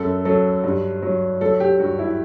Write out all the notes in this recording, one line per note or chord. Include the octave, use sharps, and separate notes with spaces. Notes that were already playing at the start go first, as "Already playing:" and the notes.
Already playing: F#2 A4
F#3 A4
G2
F#3
F#3 A4
G4
G2 F#4
E4